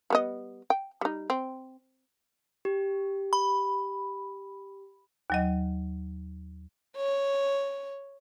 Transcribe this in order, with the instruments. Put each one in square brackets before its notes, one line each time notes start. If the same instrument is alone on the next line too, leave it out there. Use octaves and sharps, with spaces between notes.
[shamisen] G3 B3 D#5
G5
G3 D#4
C4
[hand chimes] G4
[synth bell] B5
[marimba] D#2 F#3 D#5
[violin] C#5